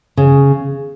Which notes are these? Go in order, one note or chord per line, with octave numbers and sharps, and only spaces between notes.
C#3